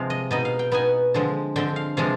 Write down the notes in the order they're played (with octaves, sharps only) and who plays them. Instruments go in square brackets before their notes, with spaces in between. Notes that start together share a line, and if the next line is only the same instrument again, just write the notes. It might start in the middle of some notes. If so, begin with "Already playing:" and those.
Already playing: [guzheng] C3 F3 G#3 F5
D#5
B2 B3 D#4 D#5
F5
G5
B2 B3 D#4 G#5
D3 F3 G#3 C4
D3 F3 G#3 C4 G5
F5
C3 F3 G#3 D4 F5